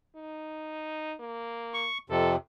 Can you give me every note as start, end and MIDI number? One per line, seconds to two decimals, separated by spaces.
0.16 1.14 63
1.20 1.86 58
1.74 1.98 85
2.10 2.36 41
2.10 2.36 48
2.10 2.34 69